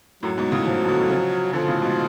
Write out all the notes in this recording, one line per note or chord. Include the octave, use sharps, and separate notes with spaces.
F#2 A2 F#3
G#2 B2
A2 C#3
C#3 F3
F3
B2 D3
D3
C#3 F3
B2 D3 F3
A2 C#3
G#2 B2